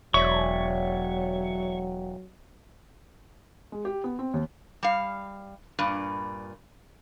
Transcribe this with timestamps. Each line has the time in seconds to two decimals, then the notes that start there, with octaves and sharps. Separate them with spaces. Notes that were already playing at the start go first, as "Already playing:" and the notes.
0.14 E1 F#3 C#5 D5 E5 C#6
3.72 G#3
3.85 G4
4.04 B3
4.19 C4
4.34 D#2
4.83 G3 F5
5.79 G2 A#2